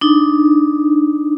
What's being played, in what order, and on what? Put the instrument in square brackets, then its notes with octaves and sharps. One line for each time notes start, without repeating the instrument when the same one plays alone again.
[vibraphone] D4 D#4